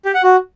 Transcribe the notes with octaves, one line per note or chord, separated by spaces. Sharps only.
G4
F#5
F#4